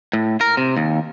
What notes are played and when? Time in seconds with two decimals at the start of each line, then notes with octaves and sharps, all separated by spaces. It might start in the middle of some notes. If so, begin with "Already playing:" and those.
0.13 A2
0.41 A#4
0.57 C3
0.77 D#2